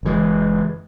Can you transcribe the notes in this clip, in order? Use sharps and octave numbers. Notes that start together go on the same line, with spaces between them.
F#1 F#2 E3 G#3